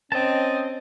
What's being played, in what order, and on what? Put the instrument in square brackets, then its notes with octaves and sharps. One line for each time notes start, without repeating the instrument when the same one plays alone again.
[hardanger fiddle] C4 [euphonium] C#4 [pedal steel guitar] D#5 A5